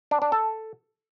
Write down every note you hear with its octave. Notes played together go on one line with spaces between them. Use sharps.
D4
D4
A4